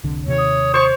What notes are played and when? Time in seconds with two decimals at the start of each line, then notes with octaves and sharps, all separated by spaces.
0.03 F1 C2 D3
0.26 D#2 C3 D#3 C#5
0.38 D#6
0.74 C5 C#5 C#6